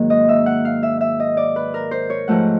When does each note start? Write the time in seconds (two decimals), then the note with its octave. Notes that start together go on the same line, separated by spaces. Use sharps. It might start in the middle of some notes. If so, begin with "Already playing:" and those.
Already playing: G#2 D#3 F#3 A#3
0.10 D#5
0.29 E5
0.46 F#5
0.65 F5
0.83 E5
1.01 E5
1.20 D#5
1.37 D5
1.56 B4
1.74 A#4
1.91 C5
2.10 C#5
2.28 G#2 F3 A3 F#5